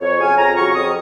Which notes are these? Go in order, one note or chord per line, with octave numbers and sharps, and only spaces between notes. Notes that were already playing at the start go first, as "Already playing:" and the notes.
F2 C#5
C#3 F#3 C#4 G#5
F2 A#5
C#3 F#3 C#4 C#6
F2 D#6